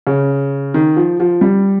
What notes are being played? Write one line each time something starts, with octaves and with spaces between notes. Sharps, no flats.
C#3
D#3
F3
F3
G3